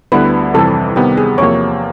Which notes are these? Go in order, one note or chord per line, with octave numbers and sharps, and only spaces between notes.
D2 D3 G3 B3 E4 B4
F2 C3 E3 G3 A4
C3 D#3 G3 B3 G4
G#4
E2 C3 F3 A#3 C#5